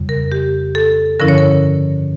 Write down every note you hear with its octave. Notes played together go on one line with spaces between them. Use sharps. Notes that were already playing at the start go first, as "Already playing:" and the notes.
Already playing: F2 C#3 G3
A#4
G4
A4
G2 D3 F3 C#4 E4 A#4
C#5
A#4